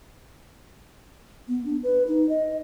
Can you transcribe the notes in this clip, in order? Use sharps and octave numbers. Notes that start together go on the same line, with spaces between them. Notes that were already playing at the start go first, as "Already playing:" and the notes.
B3
D4
B4
D#4
D#5